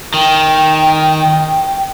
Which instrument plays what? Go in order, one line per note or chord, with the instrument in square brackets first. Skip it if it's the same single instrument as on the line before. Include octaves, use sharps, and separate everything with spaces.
[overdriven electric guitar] D#3 [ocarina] G5